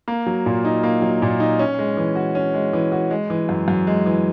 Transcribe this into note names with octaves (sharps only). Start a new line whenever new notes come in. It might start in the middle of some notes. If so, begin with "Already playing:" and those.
A#3
F#3
A#2
D#4
A#3
F#3
A#2
D#4
C#4
G#3
E3
F#4
C#4
G#3
E3
F#4
G#3
E3
F#2
F#2
G#3
E3